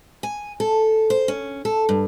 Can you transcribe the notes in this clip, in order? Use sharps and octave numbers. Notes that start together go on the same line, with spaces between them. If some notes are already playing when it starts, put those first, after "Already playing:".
G#5
A4
C5
C#4
A4
G2